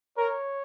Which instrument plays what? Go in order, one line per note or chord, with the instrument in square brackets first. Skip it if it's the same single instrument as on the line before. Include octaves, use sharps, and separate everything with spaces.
[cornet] A#4 [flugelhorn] C#5